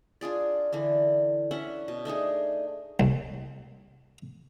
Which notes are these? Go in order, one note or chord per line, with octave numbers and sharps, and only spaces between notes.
D4 F4 G#4 D5
D3 E3 D4
C#4 D4 E5 F#5
B2
A3 D4 D#4 G#4
C2